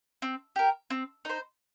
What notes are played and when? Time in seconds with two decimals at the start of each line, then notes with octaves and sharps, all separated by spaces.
0.22 C4
0.56 G4 A#4
0.90 C4
1.25 D#4 C5